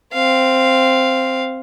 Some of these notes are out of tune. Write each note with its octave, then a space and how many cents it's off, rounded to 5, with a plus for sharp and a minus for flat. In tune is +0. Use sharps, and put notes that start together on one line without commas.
C4 +0 F5 -5